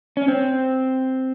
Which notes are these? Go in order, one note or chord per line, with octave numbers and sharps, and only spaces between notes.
C#4
C4